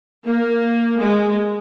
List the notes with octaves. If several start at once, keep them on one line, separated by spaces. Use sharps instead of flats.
A#3
G#3